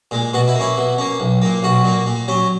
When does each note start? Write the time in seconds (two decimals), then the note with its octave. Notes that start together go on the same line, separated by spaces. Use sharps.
0.11 A#2 G#3
0.33 B2 F#4
0.48 E4
0.55 A#3
0.60 C#4 E4
0.77 B2
0.98 A#3 C#4
1.20 B1
1.42 A#2 A#3
1.63 B1 F#4
1.84 A#2 A#3
2.07 A#2
2.28 F#3 C#4